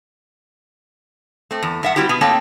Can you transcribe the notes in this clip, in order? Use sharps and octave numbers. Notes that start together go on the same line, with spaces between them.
A3 C4
E2
G2 E5 F#5
G3 C4 E4 F#4 G4
B2 B3
A3 A#3 C4 C#5 G5 A5